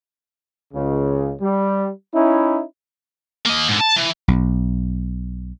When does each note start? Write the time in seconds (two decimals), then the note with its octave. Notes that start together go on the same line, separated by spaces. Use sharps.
0.73 C#2 C#3
1.40 G3
2.14 C#4 D#4 E4
3.46 A#3 D#5
3.69 G#2 D3
3.81 A5
3.97 E3
4.28 B1